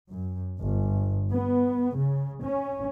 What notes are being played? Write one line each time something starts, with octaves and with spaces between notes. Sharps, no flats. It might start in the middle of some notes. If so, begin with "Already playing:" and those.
F#2
G1
B3
C#3
C#4